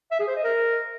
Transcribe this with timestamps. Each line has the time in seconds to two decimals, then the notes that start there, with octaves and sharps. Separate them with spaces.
0.11 E5
0.20 G#4
0.28 C5
0.36 D#5
0.44 A#4